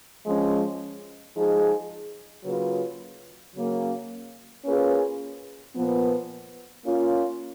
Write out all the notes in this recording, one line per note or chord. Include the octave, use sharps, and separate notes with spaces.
F3 G#3 C#4
F3 G#3 D#4 G#4
C#3 F#3 A#3 F4 B4
C#3 F#3 A#3 C#4
A#3 C#4 F4 G#4 B4
A#2 F3 B3
A#3 C#4 F4